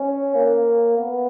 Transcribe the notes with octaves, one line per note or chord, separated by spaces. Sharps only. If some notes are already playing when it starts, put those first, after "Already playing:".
Already playing: C#4
A#3
B3